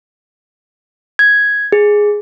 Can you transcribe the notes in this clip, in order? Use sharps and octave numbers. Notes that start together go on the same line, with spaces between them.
G#6
G#4